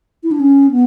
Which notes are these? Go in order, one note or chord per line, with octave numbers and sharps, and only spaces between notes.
E4
D4
C#4
B3